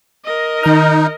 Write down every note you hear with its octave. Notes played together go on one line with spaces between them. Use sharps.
A#4 D#5
D#3 D#4 F6